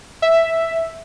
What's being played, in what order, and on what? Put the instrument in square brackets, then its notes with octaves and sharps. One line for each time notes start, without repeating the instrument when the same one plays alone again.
[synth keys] E5